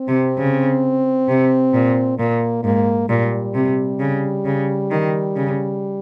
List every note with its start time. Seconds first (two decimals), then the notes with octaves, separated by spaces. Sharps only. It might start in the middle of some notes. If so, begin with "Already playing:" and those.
Already playing: C4
0.08 C3
0.38 C#3
1.29 C3
1.74 A#2
2.19 A#2 A#3
2.64 G#2 A#3
3.09 A#2 G3
3.55 C3
4.00 C#3
4.45 C#3
4.91 D#3
5.36 C#3